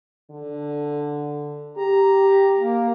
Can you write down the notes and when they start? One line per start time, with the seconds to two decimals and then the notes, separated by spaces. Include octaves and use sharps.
0.30 D3
1.77 G4 A#5
2.59 A#3